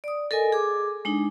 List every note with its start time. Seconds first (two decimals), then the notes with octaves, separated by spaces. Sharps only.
0.04 D5 D#6
0.31 A4 A#4 D#5 G#5
0.52 G#4 D6
1.05 G#3 D4 D#4